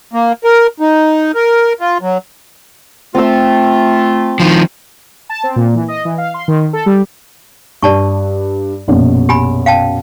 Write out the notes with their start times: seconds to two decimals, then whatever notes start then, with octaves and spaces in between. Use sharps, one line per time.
0.13 A#3
0.44 A#4
0.80 D#4
1.35 A#4
1.81 F4
2.01 F#3
3.15 A3 C4 F4 E6
4.40 D#3 F3
5.30 A5
5.44 C4
5.56 A#2
5.75 E3
5.88 D#5
6.05 E3
6.18 F5
6.34 C6
6.48 D#3
6.73 A4
6.86 G3
7.82 G2 D5 A5 C#6
8.88 A#1 F#2 B2
9.29 G4 G#5 B5
9.66 F5 G5 A5